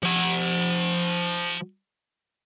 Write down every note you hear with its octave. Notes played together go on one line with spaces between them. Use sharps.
F3 F#5